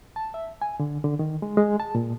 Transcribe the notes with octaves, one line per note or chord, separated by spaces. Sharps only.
A5
E5
G#5
D3
D3
D#3
G#3
G#3
A5
A#2